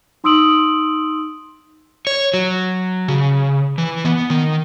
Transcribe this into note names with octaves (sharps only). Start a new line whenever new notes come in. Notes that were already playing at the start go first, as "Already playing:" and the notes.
D#4 C6 D#6 E6 D7 F#7
C#5
F#3
C#3
E3
B3
D#3